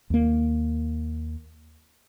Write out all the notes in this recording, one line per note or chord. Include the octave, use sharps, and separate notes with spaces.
D#2 A#3